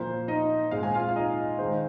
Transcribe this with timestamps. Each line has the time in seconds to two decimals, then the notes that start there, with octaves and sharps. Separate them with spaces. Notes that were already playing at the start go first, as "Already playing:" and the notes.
Already playing: A#2 F3 A#3 C5
0.28 D#4 D#5
0.71 A#2 G#3 C4 F5
0.83 G#5
0.94 F4 F5
1.08 F5
1.16 D#4 D#5
1.59 D#3 G#3 D#4 C5